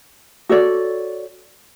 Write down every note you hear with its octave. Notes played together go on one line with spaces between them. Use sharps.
F#4 A4 C#5 D5